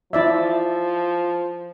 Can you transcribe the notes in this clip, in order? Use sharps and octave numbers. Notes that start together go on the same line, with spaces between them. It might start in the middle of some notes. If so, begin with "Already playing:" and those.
F3 E4 D5 E5